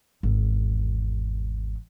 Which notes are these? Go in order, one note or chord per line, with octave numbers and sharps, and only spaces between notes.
G#1 E2